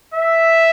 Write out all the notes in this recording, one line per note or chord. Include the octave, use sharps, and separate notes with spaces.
E5